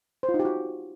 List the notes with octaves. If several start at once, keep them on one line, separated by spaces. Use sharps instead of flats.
C5
F4
D#4
G4
F#4